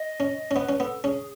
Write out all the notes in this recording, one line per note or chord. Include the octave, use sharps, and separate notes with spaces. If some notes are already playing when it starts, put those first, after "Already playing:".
Already playing: D#5
C#4
C#4
B3 B4
C#4
B3 A4
C#4 G#4